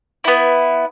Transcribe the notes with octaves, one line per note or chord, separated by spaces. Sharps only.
B3 E4